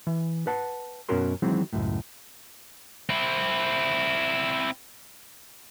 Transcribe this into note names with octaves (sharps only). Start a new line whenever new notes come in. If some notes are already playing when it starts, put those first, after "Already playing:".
E3
B4 F#5 A5
F#2 B2 C#4 F#4 A#4 C6
D#3 E3 F#3 G#3 C4
C#2 F#2 A2
C4 E4